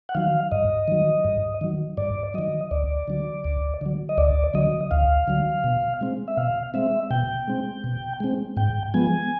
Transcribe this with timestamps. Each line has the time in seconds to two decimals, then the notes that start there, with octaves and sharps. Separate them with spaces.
0.09 F#5
0.15 D#3 F#3 F5
0.51 G2 D#5
0.88 D#3 F#3
1.25 G2
1.61 D#3 F#3
1.97 G2 D5
2.34 D#3 F#3 D#5
2.71 D2 D5
3.08 D3 F#3
3.44 D2
3.81 D3 F#3
4.09 D#5
4.18 D2 D5
4.54 D3 F#3 D#5
4.91 D2 F5
5.28 D3 F#3
5.64 B2
6.01 G#3 C4
6.28 E5
6.37 B2 F5
6.74 G#3 C4 E5
7.11 B2 G5
7.48 G#3 C4
7.84 B2
8.20 G#3 C4
8.57 G#2 G5
8.94 F3 G#3 B3 G#5